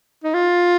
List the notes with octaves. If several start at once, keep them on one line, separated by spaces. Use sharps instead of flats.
D#4
F4